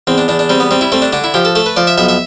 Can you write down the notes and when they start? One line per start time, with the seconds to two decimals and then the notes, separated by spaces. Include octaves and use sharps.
0.07 E2 C4
0.18 D4
0.28 E2 D4
0.39 D4
0.49 G3 C4
0.60 B3
0.71 G3 C4
0.81 E4
0.92 A3 C4
1.02 D4
1.13 D3 D4
1.24 E4
1.34 F3 G4
1.45 A4
1.55 A3 A4
1.66 B4
1.76 F3 D5
1.87 E5
1.98 B1 E5
2.08 E5